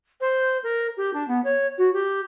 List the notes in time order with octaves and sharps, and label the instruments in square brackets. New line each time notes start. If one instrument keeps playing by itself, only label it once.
[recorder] C5
A#4
G4
D4
B3
C#5
F#4
G4